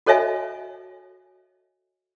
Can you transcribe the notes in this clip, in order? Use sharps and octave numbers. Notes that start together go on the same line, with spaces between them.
F#4 A4 C#5 D#5 E5 G#5